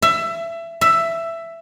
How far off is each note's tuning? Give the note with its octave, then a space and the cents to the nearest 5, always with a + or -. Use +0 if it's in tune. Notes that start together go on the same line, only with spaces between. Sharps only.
E5 +20
E5 +10